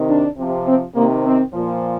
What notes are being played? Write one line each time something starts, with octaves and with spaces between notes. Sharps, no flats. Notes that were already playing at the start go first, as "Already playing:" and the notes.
Already playing: C3 D#3
D4
C3 F3
C4
C3 D#3 A#3
C4
A#2 F3